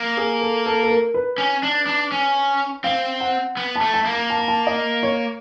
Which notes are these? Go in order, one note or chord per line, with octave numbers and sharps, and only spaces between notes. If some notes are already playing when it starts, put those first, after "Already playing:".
Already playing: A#3
G#4
A4
A4
A4
A#4
B4
C#4
D4
D4
C#4
C4 F5
F#5
B3
A5
A3
A5
A#3
A#5
A5
A#5
A5
D#5
C#5